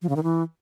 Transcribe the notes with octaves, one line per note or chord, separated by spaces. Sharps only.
F3
C#3
D#3
E3